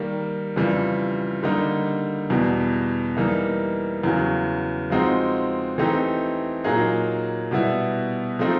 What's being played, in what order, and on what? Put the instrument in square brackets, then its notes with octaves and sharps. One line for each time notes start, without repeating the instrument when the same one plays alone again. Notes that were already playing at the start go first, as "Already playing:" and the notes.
Already playing: [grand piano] D#3 G3 A#3
F2 C#3 E3 G3
D3 G3 A#3 D#4
E2 B2 G3
E3 G3 A#3 D#4
E2 C#3 F#3
F3 G#3 C4 D#4 F#4
E3 A3 C4 D#4 G4
A#2 F#3 A#3 D#4 G#4
B2 G3 B3 E4
F3 A3 C4 D#4